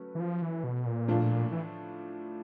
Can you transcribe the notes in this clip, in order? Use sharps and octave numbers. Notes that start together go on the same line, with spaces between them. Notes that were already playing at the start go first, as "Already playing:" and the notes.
Already playing: F#3 A3 C#4 B4
E3
F3
E3
B2
A#2
A2 F3 A3 D4 F4
E3